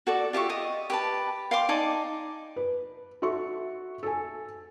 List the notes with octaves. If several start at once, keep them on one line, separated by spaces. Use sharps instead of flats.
F#4 A4 D5
F4 G4 E5 C#6
D#5
G4 B4 A5
F5 G5 C6 D6
D#4 D5 G#5 A5
B4
F#4 A4 E5 C#6
A4 G#5